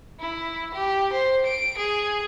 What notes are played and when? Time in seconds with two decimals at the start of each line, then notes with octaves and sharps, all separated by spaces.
0.20 E4
0.74 G4
1.12 C5
1.45 D7
1.77 G#4